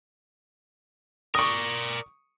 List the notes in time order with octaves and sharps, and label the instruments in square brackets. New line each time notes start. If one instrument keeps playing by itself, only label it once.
[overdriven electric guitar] A#4 D5 [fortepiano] C#6 D#6